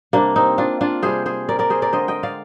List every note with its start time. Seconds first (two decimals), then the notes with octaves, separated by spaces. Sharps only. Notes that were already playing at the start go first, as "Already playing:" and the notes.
0.13 C3 G3 A#3 D4
0.36 C4 D#4
0.58 D4 F4
0.81 D4 F4
1.03 C3 G3 G#4 C5
1.26 G#4 C5
1.49 A#4 D5
1.59 A#4 D5
1.70 G#4 C5
1.82 A#4 D5
1.92 D3 G#3 C5 D#5
2.08 D#5 G5
2.23 D5 F5